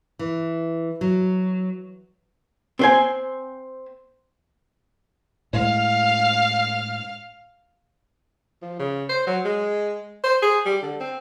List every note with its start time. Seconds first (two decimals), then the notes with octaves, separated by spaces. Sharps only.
0.19 E3
1.01 F#3
2.79 C4 C5 G#5
5.53 A2 G#3 F5 F6
8.62 F3
8.79 C#3
9.09 C5
9.27 F#3
9.44 G#3
10.24 C5
10.42 G#4
10.65 G3
10.82 D3
11.00 C4